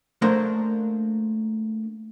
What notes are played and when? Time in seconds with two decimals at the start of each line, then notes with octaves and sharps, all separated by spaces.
0.22 A3 A#3 D4 A#4 C5